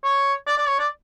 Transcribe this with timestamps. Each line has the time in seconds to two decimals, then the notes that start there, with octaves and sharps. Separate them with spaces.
0.04 C#5
0.47 D5
0.58 D5
0.68 C#5
0.79 D5